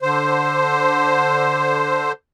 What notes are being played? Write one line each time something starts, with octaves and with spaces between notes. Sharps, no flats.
D3 C5